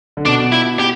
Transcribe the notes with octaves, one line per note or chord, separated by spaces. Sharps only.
D3
B2 D4
E4
G4